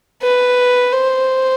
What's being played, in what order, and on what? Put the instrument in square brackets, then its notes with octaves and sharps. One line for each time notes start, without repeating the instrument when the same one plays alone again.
[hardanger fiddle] B4
C5